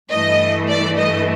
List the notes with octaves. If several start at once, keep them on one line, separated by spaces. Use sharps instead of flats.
G2 E3 A3 D#5
D5
D#5